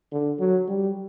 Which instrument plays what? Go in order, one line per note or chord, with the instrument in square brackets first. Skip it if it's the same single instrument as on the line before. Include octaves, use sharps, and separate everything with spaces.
[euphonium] D3
F#3
G3